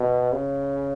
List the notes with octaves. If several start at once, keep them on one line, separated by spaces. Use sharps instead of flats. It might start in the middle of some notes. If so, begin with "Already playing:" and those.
Already playing: B2
C#3